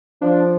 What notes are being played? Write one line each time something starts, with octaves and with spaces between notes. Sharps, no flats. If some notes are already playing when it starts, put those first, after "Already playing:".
F3 D4